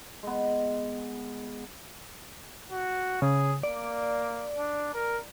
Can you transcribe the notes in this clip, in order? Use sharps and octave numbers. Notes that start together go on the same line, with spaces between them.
G#3 B3
F#4
C#3 G#4
A#3 D5
D4
A#4